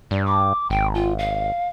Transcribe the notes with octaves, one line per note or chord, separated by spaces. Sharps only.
G2 D5
D6
G#1 G5
F4
F5